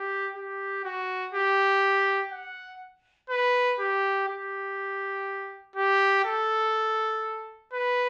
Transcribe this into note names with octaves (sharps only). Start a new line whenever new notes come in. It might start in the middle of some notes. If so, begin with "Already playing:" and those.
Already playing: G4
G4
F#4
G4
F#5
B4
G4
G4
G4
A4
B4